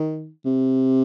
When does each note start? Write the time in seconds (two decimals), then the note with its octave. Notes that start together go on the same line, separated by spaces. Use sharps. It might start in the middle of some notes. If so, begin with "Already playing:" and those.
Already playing: D#3
0.45 C3